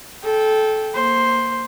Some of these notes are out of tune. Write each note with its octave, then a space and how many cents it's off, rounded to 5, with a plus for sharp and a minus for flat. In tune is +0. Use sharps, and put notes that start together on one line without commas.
A4 -20 G5 +0
A#3 +0 C5 +5